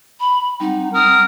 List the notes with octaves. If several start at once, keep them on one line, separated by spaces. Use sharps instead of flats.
B5
G3 C4 D#4 F#5
A#4 D#6